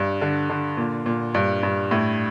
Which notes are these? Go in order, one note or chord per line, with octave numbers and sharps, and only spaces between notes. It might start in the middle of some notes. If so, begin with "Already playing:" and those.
Already playing: G2
D3
D3
A#2
A#2
G2
G2
A2